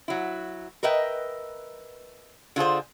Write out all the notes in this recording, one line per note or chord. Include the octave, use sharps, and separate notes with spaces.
F#3 E4
A#4 B4 D#5 E5 G5
D3 F4 G#4 C5